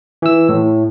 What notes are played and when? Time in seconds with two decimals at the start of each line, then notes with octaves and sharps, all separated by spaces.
0.22 E3 E6
0.49 A2